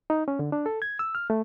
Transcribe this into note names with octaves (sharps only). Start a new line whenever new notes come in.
D#4
C#4
D3
D4
A4
G#6
E6
F6
A3